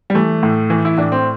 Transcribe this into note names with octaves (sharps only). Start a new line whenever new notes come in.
G3
E3 A3
A2
E3
E4
A2 D4
C4